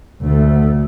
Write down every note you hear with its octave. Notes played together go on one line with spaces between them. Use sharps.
D2 A3